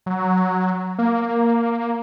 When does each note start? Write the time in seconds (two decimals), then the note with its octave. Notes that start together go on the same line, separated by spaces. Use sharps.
0.06 F#3
0.98 A#3